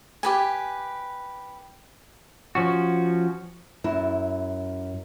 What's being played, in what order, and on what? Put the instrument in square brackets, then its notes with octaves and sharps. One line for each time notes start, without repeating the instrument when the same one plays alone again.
[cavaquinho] G4 B4 G#5
[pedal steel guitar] F3 C#4 F#4
[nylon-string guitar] F#2 E4